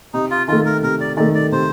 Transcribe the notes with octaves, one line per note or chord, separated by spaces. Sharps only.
C3 D#4
F4
D#3 A3 F4
A#4
C3 A#4
D5
D#3 A3 D5
D5
C3 C5